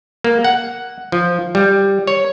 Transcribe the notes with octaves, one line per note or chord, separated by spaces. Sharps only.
A#3
F#5
F3
G3
C#5